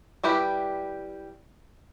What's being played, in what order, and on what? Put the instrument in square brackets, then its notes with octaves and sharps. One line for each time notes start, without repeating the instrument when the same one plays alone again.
[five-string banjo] G3 E4 G4 B4 B5